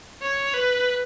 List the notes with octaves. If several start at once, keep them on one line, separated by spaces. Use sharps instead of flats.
C#5
B4